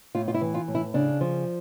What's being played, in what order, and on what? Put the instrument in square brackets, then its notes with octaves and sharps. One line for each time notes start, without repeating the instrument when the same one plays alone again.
[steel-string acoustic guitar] A2 F4
F4
E4
E3
F4
A2
E4
C#3 D4
F3